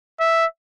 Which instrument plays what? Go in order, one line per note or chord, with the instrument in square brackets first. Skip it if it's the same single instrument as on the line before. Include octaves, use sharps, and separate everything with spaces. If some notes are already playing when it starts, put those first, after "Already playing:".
[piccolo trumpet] E5